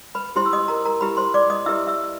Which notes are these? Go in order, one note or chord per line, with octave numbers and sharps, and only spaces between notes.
B4 B5
E4 G4 C5 C6
E6
D#5 D#6
A#4 A#5
A#4 A#5
E4 G4 B4 B5
C5 C6
D5 D6
D#5 D#6
E4 G4 B4 E5 E6
E5 E6